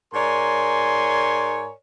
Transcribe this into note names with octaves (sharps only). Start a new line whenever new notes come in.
G#2 A#4 C#5 D5 G#5 C6